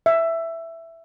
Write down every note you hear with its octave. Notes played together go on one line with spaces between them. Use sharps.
E5